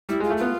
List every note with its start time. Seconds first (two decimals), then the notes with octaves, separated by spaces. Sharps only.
0.09 G3 E4
0.20 G#3
0.23 F4
0.30 A3
0.37 B3 F4